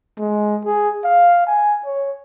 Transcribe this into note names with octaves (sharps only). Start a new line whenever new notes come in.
G#3
G#4
F5
G#5
C#5